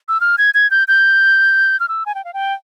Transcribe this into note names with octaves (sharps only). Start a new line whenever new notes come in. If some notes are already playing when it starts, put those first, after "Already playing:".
E6
F6
G#6
G#6
G6
G6
F6
E6
G#5
G5
F5
G5